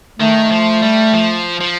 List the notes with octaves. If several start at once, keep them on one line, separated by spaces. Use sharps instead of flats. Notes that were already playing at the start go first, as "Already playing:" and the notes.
D#3 A3
F3
G3
F3
F3